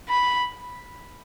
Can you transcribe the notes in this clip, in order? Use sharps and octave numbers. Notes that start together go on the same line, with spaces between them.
B5